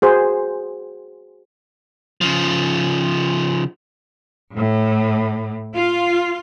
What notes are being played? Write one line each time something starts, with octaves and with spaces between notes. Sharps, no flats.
F#4 G#4 C5
C#3 F3
A2
F4